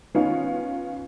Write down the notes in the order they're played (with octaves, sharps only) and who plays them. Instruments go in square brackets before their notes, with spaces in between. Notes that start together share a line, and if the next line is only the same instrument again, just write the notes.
[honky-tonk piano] D#3 B3 C#4 D#4 F4